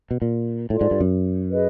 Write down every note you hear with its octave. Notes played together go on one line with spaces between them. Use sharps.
B2
A#2
A2 F4 A4 D5
G#2
G2
F#2
G#4 B4 D#5